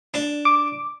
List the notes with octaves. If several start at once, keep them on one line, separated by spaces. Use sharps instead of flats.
D4
D6